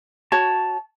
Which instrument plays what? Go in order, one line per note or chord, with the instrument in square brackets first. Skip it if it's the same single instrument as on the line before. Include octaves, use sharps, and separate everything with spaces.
[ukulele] F#4 C#5 [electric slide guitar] A5